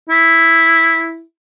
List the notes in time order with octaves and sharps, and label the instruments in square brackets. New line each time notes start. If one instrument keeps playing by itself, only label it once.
[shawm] E4